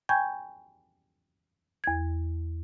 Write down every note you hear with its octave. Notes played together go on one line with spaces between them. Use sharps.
G5 G#5 B5 C#6 G6 G#6
E2 G#6